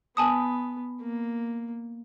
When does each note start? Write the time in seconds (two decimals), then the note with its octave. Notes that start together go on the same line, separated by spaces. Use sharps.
0.17 B3 G#5 A5 D#6
1.02 A#3